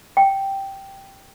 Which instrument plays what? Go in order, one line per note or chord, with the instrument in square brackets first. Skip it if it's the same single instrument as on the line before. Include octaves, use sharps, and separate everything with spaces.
[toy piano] G5